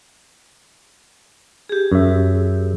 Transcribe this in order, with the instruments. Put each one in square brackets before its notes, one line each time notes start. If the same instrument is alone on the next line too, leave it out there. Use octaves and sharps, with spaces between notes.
[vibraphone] G4 G#4
[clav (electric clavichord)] F#2 E5